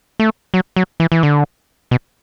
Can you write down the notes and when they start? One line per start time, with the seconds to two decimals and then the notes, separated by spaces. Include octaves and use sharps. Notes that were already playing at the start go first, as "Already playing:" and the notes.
0.20 A3
0.54 F#3
0.76 F#3
1.00 E3
1.12 E3
1.23 D3
1.91 B2